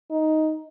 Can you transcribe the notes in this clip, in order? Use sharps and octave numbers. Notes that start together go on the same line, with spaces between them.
D#4